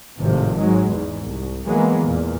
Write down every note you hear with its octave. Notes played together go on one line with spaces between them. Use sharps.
G#1 A2 C3 F3
G#2 F#3 G#3
E2 G#2
C2
E3 F#3 G#3 A#3 B3
E2 A#2